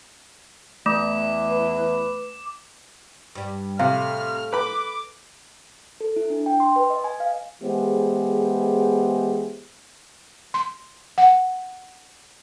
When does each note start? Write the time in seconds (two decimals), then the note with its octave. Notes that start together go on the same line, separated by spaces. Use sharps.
0.86 E2 E3 A3 D6
1.50 B4
3.35 G2 G3
3.79 A2 C3 F5 F6
4.53 B4 B5 D6
6.01 A4
6.16 E4
6.30 D4
6.46 G5
6.60 C6
6.76 B4
6.90 D#5
7.04 G#5
7.20 F5
7.62 E3 G#3 B3 G4 G#4 C5
10.54 C6
11.18 F#5